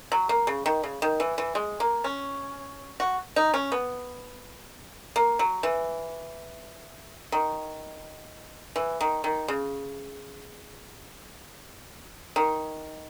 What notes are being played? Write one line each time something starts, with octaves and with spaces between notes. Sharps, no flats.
F#3
A#3
C#3
D#3
C#3
D#3
E3
E3
G#3
A#3
C#4
F#4
D#4
C#4
B3
A#3
F#3
E3
D#3
E3
D#3
D#3
C#3
D#3